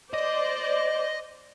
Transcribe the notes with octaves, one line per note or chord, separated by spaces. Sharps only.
C5 D5 D#5